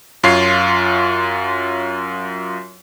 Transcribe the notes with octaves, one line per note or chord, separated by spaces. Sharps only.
F#2 F4 C#5 C7